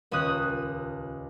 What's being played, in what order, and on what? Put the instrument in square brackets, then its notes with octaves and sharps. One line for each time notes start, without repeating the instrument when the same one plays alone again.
[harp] D#1 C#2 C#4 D#6 F#6